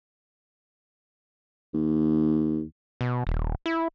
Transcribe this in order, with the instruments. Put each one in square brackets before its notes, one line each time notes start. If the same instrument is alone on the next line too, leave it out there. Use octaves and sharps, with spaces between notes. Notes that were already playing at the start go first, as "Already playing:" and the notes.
[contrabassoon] D#2
[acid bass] B2
D#1
E4